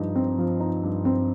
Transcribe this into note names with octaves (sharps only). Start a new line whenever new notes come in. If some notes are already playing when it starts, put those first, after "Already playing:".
Already playing: G2 F3 D#4
C4
F3
D#4
G2
C4